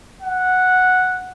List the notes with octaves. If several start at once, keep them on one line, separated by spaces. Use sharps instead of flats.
F#5